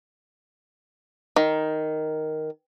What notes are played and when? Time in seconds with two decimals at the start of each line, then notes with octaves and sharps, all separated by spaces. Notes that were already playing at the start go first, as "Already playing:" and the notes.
1.36 D#3